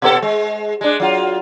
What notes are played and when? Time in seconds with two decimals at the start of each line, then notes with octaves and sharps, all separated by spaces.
0.02 B2 B3 A4
0.22 G#3
0.81 G#3 D4
1.00 F#3 F4